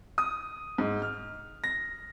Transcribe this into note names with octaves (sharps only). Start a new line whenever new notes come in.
D#6
G#2
F6
A#6